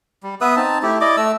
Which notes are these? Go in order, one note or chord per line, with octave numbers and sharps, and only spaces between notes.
G3
B3 B4 E5 D#6
C4 D#4 A5
A3 E4 G4
E4 D5 D#5 D6
A3 E6